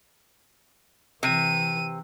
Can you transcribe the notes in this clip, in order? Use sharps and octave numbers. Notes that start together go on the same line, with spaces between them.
C3 E3 D#7